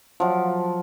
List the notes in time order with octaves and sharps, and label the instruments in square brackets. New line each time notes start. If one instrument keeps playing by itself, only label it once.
[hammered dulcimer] F3 F#3